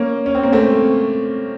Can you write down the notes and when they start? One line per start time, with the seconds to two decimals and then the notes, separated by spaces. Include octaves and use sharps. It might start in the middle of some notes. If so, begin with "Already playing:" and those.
Already playing: A#3 C#4
0.26 C#4
0.35 C4
0.43 A#3
0.52 A3 C4